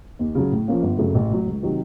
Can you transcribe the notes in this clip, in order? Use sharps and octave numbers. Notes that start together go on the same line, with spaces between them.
D#2
C#3 F#3
A2
F3 A#3 C#4 F4
G1
F#2 C#3 F#3 A3
A1
A2 F#3
C#2
C3 D#3 F#3